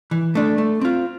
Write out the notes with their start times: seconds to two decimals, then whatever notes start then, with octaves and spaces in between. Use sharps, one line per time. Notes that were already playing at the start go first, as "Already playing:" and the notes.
0.11 E3
0.35 A3 D4
0.58 A3
0.81 C4 F4